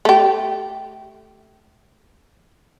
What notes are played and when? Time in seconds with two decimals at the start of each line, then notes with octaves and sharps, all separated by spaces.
0.05 A3 G4